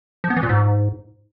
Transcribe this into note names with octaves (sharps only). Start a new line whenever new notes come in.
F3
B3
E3
A#2
G#2